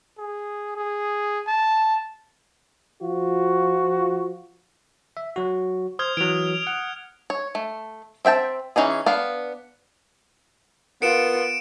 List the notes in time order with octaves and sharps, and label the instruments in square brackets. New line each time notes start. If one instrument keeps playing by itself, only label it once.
[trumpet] G#4
G#4
A5
[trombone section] F3 F4 F#4
[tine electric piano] E5
F#3 F#4
[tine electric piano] C5 [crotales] D#6 F6 G#6
[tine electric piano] E3 F#3 [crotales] D7 F7
[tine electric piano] F#5
[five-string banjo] C#5
A3
C4 E5 G5 A5
E3 C#4 D#4 G#4
B3 D4 F5
[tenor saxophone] B3 [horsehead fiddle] F4 [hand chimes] A#4 [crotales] C#7 D7 E7